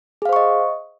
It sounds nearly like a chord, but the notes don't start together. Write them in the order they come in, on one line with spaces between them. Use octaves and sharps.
G#4 F5 C5 C#6 D#5